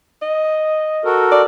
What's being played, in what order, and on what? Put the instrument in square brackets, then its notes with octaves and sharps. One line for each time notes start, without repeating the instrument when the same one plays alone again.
[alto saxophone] D#5
[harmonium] F#4 A4 A#4
[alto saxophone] D5